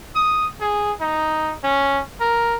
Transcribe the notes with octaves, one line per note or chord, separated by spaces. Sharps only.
D#6
G#4
D#4
C#4
A#4